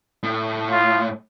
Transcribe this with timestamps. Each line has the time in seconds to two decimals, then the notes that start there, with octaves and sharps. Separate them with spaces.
0.23 A2
0.71 F4